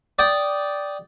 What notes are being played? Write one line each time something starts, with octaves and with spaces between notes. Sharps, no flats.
D5 G5 D#6